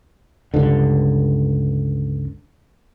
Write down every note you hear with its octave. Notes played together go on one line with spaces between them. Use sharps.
C#2 G2 D3